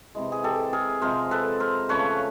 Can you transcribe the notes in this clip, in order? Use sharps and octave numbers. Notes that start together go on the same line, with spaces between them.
C3 E3 G#3
G#4
G4 A4
G#4 A#4
C3 F3 G#3 A#4 C5
A4 B4
A#4 C5
C#3 F3 A3 B4 C#5